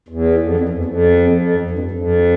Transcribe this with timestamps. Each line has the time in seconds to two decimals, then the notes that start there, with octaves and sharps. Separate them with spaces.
0.09 E2
0.38 F2
0.60 F2
0.69 E2
0.85 F2
1.20 E2
1.30 F2
1.60 F2
1.70 G2
1.79 F2
1.91 F2